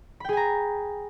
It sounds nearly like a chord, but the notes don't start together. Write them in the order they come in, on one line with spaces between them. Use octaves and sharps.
B5 G5 G#4 G#5 A#5